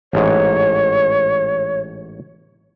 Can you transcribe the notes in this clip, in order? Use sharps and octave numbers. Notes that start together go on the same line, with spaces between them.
A1 G#2 C#5